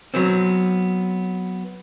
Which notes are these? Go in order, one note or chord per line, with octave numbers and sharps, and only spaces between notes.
F#3 B3 C4